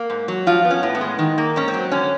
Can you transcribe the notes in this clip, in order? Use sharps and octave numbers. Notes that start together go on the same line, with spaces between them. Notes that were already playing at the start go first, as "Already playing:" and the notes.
Already playing: A#3
G#2
F#3
F3 F4
B3
C#4
A2
B3
G#3
D#3
A#3
G#2 C#4
C4
F#3
D3 C#4